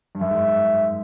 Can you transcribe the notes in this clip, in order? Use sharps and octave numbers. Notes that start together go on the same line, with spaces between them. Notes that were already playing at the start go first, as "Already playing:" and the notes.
G2
F#2 E5
G#2